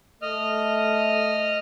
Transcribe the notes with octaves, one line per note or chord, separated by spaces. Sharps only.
A3 D#5 F6